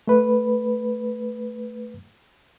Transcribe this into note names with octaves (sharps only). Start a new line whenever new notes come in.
A3 B4